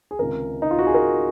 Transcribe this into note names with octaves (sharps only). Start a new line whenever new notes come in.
G#4
C#2 C3 D#3 A#4
D#4
F4
F#4
G#4
A#4